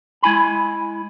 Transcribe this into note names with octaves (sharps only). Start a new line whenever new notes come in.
G#3 E4 G#5 B5